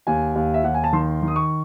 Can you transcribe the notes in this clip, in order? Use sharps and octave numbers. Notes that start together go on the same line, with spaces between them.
D#2 G#5
D#2
E5
D#2 F#5
G#5
A5
D#3 C6
D#3
D#6
C#6